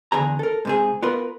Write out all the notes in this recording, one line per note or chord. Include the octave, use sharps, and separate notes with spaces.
E2 G2 D3 G#4 A#5
A4 A#4
G#2 C3 G#4
B3 F4 A#4 B4